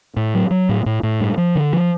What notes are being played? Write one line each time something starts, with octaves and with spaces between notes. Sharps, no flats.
A2
F#3
F#3
A2
A2
A2
G2
F3
D3
F3